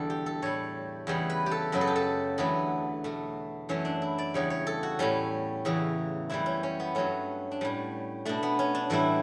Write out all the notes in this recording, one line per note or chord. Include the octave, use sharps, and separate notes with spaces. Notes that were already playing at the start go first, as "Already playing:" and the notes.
Already playing: E2 B2 D3 G3 A4
G4
A4
A2 G3 C#5
E2 C#3 E3 G3 C#5
B4
G4
A4
F#2 C#3 F#3 B4
A4
G4
A4
E2 D3 F#3 A3 B3
B2 A3
F#2 E3 A3 C#4
D4
E4
D5
E2 C#3 G3 C#5
C#5
A4
F#4
A2 G3 C#4
E2 C#3 E3
F#2 E3 G3 E4
C#4
C#4
B3
G2 F#3 A3 C#4
D4
A2 G3 C#4
B2 A3 D4
B3
C#4
D4
A2 E3 G3 E4